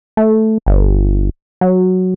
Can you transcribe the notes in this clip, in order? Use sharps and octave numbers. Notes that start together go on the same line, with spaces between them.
A3
G1
F#3